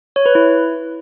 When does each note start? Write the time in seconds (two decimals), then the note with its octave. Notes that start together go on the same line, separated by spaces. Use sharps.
0.16 C#5
0.26 B4
0.35 E4